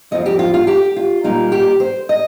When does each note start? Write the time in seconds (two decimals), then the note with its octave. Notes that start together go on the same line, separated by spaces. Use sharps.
0.11 F2 F3 C4 F4 D#5
0.26 G4
0.39 F4
0.54 F4
0.67 G4
0.96 F4
1.24 A#2 G3 A#3 D#4 F4
1.52 G4
1.80 C5
2.09 D#5